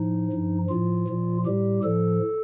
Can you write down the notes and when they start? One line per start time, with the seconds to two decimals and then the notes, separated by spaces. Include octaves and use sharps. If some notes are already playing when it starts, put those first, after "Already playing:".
Already playing: A2 F3 D#4
0.32 G2 F3
0.69 A2 F3 F4
1.08 A#2 F3
1.46 A2 G3 G4
1.84 A2 F3 A4